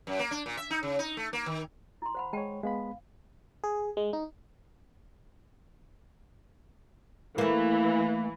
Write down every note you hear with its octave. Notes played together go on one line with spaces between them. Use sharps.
F#2
A#3
D4
A#2
E5
D#4
C#3
D#4
A3
A#3
D#3
E4 C6
C5 F#5 B5
G#3 C#5 G5 A5
G#3 B3 F5 B5
G#4
G#3
D#4
E3 A3 A#3